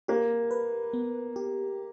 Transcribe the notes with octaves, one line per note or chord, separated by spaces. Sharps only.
A#3 G4
B4
B3
G4